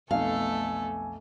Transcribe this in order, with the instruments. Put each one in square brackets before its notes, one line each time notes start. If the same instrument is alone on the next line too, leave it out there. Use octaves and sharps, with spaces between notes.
[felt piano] B1 F2 [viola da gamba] A3 B3 A4 [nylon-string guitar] F5 [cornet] G#5